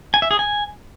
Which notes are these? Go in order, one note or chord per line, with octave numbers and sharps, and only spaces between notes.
G#5
E5
G#4
G#5